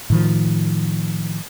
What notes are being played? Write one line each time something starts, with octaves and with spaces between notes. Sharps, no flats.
A2 D#3 F3